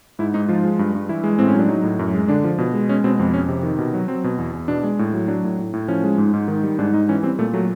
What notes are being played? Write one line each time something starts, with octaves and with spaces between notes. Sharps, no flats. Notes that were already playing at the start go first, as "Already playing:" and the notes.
G#2 E4
G#2 D#4
F3 F4
G#3
G2
G2
E3 E4
G#3
A2 C4
C#4
F#3 D4
F#3 D#4
A2
F#2
G#3
D3 D4
F3
B2
G#3
G#3 C#4
B2 C4
F2 C4
F2 C#4
C3
D#3
B2
F#3
F#3 C4
B2
E2
E2
B2 D4
G#3
A2
F#3
F#3 D4
A2
A2
A2
F3 C#4
G#3
G#2
G#2
D#3
G3
G#2 D4
G#2 D#4
E3 C#4
G3 C4
A#2 A3
F#3 A3